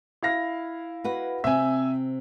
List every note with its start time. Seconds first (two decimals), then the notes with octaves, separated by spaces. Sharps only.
0.23 E4 F5 A#6
1.04 F#4 B4 F#5
1.44 C3 C4 E5 G#5